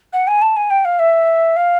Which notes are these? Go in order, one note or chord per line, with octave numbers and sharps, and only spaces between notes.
F#5
G#5
A5
G#5
G5
F5
E5
F5